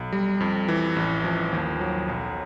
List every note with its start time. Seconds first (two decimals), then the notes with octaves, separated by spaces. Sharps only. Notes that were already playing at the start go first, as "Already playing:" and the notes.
Already playing: B1
0.13 G3
0.40 F2
0.68 E3
0.96 A1
1.24 F3
1.53 D#2
1.80 F#3
2.08 B1